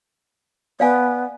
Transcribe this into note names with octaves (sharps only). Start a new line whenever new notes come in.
B3 D5 F5 G#5